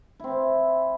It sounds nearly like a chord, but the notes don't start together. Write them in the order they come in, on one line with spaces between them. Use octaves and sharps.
E4 C4 E3